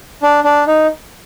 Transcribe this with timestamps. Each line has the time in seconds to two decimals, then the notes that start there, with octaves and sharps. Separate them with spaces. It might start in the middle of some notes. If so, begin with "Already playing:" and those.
0.22 D4
0.44 D4
0.67 D#4